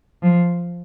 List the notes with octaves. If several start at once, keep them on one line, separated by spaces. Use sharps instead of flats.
F3